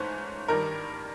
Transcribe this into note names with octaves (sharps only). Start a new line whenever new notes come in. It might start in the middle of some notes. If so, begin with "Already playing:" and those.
Already playing: G#2 E3 A3 C#4 C5
G2 D#3 G3 A#4